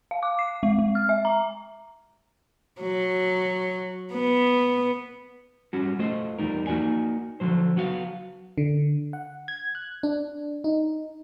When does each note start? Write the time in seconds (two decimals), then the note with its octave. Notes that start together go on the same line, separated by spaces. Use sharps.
0.11 F5
0.23 D6
0.39 C7
0.63 G#3
0.79 G#3
0.95 F6
1.09 E5
1.25 A#5
2.81 F#3
4.13 B3
5.73 G3 C#4 F#4
5.99 A3 F4 C5 D#5
6.39 E2 G3 D#4 A#4
6.67 A#3 D#4 F#4 D5 G#5
7.40 D3 F3 F#3 C5
7.76 F#3 B3 F#4 D#5 F5
8.58 D3
9.13 F#5
9.48 G#6
9.75 F#6
10.03 D4
10.64 D#4